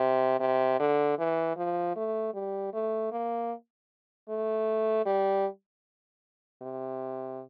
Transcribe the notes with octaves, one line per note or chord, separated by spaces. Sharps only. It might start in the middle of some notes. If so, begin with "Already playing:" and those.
Already playing: C3
C3
D3
E3
F3
A3
G3
A3
A#3
A3
G3
C3